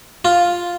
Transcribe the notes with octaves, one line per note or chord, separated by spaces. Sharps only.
F4